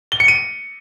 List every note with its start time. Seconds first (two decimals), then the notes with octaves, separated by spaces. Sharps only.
0.12 G7
0.20 C#7
0.28 D#7